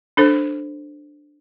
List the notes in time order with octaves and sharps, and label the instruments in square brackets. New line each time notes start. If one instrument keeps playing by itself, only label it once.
[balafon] D4 A4 C5